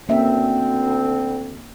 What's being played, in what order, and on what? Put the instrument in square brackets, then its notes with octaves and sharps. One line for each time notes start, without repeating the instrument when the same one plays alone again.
[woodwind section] D2 C4 [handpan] A#3 C#4 E5